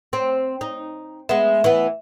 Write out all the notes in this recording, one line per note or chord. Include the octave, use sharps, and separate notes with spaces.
C4
D#4
G#3 B3 E5
E3 B3